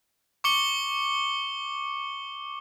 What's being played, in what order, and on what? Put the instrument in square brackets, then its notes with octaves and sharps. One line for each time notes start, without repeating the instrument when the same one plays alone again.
[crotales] C#6 D6 C#7 G7